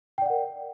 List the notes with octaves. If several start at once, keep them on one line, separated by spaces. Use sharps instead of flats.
A#4 D5 F#5 G5